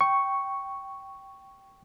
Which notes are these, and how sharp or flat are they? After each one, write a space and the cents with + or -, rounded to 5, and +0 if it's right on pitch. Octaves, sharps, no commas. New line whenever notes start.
G5 -10 C#6 +0